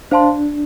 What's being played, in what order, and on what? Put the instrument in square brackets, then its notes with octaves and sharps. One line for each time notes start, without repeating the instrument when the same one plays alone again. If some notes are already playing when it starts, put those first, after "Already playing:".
[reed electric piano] D4 [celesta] C5 F5 A5 C6